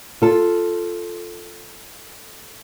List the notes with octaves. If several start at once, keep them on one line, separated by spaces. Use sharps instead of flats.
F4 A4